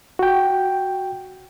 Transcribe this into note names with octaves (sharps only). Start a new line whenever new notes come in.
F#4 G5